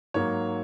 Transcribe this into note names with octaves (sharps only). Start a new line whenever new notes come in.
G#2 F#3 A#3 C#5